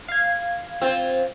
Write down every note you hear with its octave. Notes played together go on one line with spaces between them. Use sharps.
F5 G#6
C4 F4